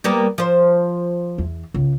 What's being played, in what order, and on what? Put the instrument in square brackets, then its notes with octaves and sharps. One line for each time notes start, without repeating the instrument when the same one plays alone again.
[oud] G3 A#3 B3
F3 C5
[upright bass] E2
C#2